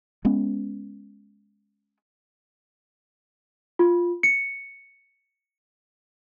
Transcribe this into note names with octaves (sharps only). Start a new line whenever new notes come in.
G#3 B3 C#4
F4
C#7